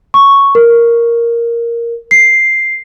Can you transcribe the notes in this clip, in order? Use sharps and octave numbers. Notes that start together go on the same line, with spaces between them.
C#6
A#4
C7